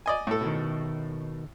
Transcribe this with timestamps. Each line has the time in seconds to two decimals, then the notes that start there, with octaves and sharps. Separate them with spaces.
0.06 D5 D#5 G#5
0.27 A2 A4
0.41 B2 D#3